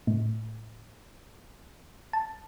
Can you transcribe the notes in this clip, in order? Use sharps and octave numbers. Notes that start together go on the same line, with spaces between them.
A2
A5